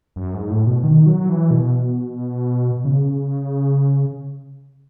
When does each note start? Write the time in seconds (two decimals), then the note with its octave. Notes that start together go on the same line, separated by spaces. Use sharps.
0.16 F#2
0.34 G#2
0.50 A2
0.67 B2
0.84 D#3
1.06 F#3
1.29 E3
1.51 B2
2.85 C#3